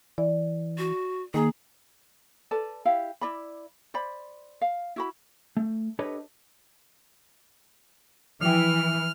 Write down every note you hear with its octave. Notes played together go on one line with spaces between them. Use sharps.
E3 D5
F#4
D#3 A#3 G#4 G#5 A#5
A4 B4 D5 A5
E4 G4 F5
E4 D5 B5
C5 D5 B5
F5
E4 F#4 B5
A3
D4 G4 A4 B4 C#5 D#5
E3 F3 G5 F6